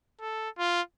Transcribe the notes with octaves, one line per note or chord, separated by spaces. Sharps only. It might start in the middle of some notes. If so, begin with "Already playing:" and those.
A4
F4